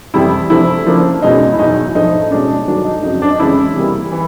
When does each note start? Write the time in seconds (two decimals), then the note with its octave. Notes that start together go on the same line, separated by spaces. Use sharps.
0.14 F2 C3 E3 G3 E4
0.50 C3 F3 A3 D4 E4
0.87 C#3 F3 A#3 D4
1.22 E2 B2 G#3 C#4 D#4
1.52 E4
1.59 E2 B2 F#3 D#4
1.95 A2 F3 A3 D4 D#4
2.31 B2 G#3 C#4 D4
2.68 G2 D#3 F#3 A3 D4
2.85 D#4
3.03 F2 C#3 F#3 D#4
3.22 D4
3.31 D#4
3.39 F2 C#3 E3 G#3 C#4 E4
3.76 C3 E3 G3 A#3
4.12 E3